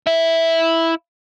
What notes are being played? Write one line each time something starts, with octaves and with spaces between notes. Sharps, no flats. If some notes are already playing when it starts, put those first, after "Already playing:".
E4 E5